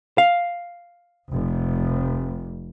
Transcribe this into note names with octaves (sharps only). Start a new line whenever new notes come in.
F5
F1